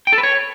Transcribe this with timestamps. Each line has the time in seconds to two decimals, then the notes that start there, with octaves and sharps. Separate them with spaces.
0.07 G5
0.13 A4
0.18 B4
0.23 C#5